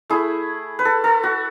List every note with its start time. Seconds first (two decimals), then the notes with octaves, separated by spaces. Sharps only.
0.10 A3 E4 G#4
0.79 B4
0.85 A4
1.04 A4
1.23 F#4